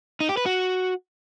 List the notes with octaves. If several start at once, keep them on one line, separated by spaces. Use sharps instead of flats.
D#4
G4
B4
F#4